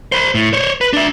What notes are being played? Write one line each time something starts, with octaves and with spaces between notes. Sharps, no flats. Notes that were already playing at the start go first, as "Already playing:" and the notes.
C5 B5
A2
C5 C#5
B4
D4 E5